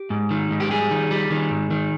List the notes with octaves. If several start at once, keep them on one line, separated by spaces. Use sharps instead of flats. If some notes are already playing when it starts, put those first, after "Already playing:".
Already playing: G4
G#2
D#3
G#2
G4
G3 G#4
D#3
G3
D#3
G#2
D#3